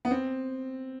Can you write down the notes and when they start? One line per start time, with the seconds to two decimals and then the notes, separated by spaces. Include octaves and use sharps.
0.05 B3
0.11 C4